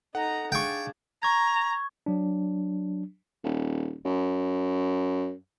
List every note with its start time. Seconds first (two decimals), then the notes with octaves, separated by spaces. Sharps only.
0.15 D#4 A4 F#5 A#5
0.52 D4 G#4 F5 G5 C#6 G#6 A6
1.23 A#5 C#6 G#6
2.06 F#3 D4
3.44 D#1
4.05 F#2